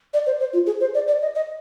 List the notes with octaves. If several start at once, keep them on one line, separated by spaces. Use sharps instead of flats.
D5
C5
C5
F4
G#4
C5
D5
D5
D#5
D#5